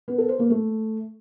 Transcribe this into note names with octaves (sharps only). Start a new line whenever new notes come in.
B3
A4
C5
A#3
A3